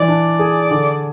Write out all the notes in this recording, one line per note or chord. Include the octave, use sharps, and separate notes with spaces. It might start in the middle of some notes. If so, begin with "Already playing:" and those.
Already playing: E3 D5
D4
G#4
D3